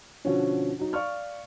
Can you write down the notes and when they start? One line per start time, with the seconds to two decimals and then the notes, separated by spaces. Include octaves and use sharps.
0.25 B2 D3 F3 C#4
0.79 F#3 D#4
0.93 D5 F5 C#6 F6